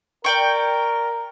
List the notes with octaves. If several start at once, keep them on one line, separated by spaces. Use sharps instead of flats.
A#4 D5 G5 C#6